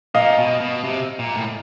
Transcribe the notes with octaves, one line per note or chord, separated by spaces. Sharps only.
A#2 D#5 F5
B2
B2
C3
A#2
A2